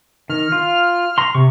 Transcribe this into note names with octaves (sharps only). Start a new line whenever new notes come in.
D#3 F6
F4
A#5 C6
C3 C#6